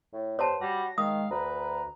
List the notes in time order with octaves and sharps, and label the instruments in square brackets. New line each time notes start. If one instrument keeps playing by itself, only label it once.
[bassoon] A2
[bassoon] G2 [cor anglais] C5 [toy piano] C#5 A5
[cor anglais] G3 [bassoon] F#4 [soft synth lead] A#6
[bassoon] D#3 [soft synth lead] G#3 [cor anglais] F5 [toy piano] D#6
[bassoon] D2 [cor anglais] B4 [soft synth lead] A#5